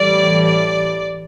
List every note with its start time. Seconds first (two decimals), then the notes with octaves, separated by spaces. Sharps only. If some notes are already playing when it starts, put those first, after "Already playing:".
Already playing: A2 E3 G3 D5
0.46 D5